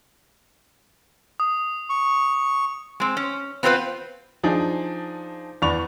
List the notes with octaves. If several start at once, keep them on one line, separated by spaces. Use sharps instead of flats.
D#6
C#6
G#3 C4
C#4
B3 C4 F4 A4 B4 C5
F3 D4 D#4 G#4
E2 D5 B5 C#6 F7